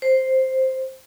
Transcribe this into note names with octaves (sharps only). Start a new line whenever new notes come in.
C5